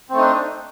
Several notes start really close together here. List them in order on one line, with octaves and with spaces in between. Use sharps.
C4 A3 D#4 D4